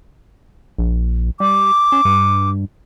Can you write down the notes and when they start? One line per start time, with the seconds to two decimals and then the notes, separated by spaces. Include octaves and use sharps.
0.78 A#1
1.40 G3 D6
1.92 C#4
2.05 G2